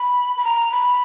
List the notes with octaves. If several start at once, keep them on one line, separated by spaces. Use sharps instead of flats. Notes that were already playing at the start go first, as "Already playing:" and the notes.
Already playing: B5
B5
A#5
B5